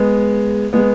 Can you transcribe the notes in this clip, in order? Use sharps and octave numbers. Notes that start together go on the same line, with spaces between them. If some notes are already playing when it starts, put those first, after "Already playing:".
Already playing: G#3 B3
G#3 B3